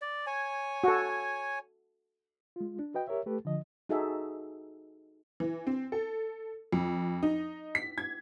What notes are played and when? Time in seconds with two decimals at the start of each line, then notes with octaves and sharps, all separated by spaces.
0.02 D5
0.27 C#5 G#5
0.84 F#4 A4
2.56 G#3 F4
2.79 D4
2.94 F#4 B4 D#5 G5
3.07 G4 A#4 C#5 E5
3.26 A3 G4 A4 B4
3.45 D3 F3 D#5
3.89 D#4 F#4 G#4 A4 E5
5.40 E3
5.67 C4
5.92 A4
6.73 F2
7.23 D#4
7.75 B6
7.98 G#6